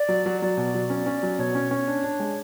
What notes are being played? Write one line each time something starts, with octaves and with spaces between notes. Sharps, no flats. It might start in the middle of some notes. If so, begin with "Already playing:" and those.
Already playing: D5
F#3
F#3
F#3 D5
B2
F#3
C#4
C#4
F#3
B2 C#5
C#4
C#4
D4
D4
G#3